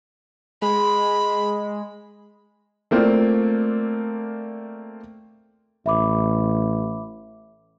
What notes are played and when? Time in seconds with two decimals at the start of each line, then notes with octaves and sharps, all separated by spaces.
0.62 G#3 B5
2.91 A3 A#3 C4 F4 D5
5.86 A1 E5 B5 D6